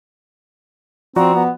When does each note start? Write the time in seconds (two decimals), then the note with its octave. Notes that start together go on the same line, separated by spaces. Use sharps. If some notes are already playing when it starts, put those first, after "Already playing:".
1.16 F3 C4 F#4 D5 A#5
1.34 B3